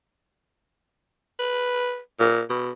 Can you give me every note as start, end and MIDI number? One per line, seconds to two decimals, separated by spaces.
1.39 1.99 71
2.20 2.41 46
2.50 2.71 47